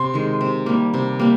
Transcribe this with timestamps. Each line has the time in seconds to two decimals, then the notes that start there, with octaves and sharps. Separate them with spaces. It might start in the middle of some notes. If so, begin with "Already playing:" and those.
Already playing: C3 C6
0.14 D#3 G#3
0.41 C3
0.66 G3 A#3
0.94 C3
1.19 G3 A#3